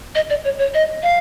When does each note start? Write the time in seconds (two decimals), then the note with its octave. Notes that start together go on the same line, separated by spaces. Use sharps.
0.15 D#5
0.30 D5
0.45 C#5
0.59 C#5
0.74 D#5
1.03 F5